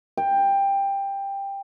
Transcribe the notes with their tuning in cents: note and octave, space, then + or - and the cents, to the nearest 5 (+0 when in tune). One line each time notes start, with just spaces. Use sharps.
G5 +15